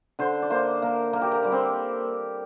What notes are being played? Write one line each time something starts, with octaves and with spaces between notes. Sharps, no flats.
D3 C5
D5
A#3 C5
A#3 A#4
A#3 A#4
G4
A#4
G3
C4